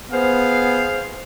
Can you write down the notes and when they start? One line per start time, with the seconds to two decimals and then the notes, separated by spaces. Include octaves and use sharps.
0.12 B3 G#4 C5 F5